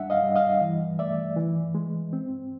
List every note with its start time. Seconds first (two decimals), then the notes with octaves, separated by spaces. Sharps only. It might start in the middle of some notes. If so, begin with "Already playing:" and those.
Already playing: G3 D4 E5 F#5
0.10 D#5 F5
0.23 G3
0.36 D#5 F5
0.61 E3
0.99 A3 D5 E5
1.36 E3
1.75 G#3
2.13 C4